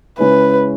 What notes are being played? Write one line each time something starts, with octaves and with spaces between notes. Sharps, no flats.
C#3 G#3 C#4 E4 B4